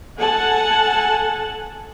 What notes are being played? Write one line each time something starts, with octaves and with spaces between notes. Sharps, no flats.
A4 F#5 G#5 A5